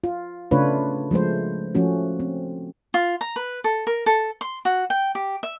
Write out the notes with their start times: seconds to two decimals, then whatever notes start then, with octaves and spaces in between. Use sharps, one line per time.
0.04 F4
0.51 C#3 A3 D4 F4 B4 C#5
1.11 F3 G#3 A3 C5
1.75 F3 A3 C#4 F#4
2.20 C4
2.94 F4
3.21 A#5
3.36 B4
3.64 A4
3.87 A#4
4.06 A4
4.41 C6
4.65 F#4
4.90 G5
5.15 G4
5.43 E5